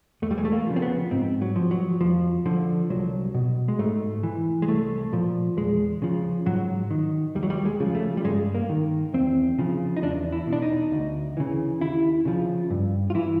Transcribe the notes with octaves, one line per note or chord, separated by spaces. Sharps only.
E2 A3
G3
G#3
A3
A#3
C#3 F3
C4
B3
G#2 C4
F#3
F3
F#3
F2 F3
D3 F3
C2 F#3
B2
G#3
G#2 A3
E3
G#3
C2 A3
A#2 F3
E2 G#3
C#3 F3
G#2 F#3
D#3
D#2 G3
F#3
G3
G#3
C#3 F3
A3
G3
G2 G#3
A#3
D#3
E2 C4
C#3 F3
D#4
E2 D4
E4
B2
D4
D#4
D2
C#3 E3
D#2 E4
C#3 F3
G2
F4
E3 E4